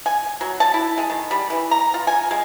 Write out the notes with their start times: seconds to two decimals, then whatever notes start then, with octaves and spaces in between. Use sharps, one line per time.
0.06 G#5
0.41 F#3
0.60 A5
0.74 E4
0.98 G#3
1.10 D#3
1.31 G3
1.50 E3
1.71 A#5
1.94 F4
2.07 G#5
2.31 G#3